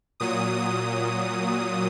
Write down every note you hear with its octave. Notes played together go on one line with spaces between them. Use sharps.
A#2 F#3 D#6
D#6